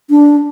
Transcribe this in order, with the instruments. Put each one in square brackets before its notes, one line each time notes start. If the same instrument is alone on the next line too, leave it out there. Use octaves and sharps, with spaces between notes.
[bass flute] D4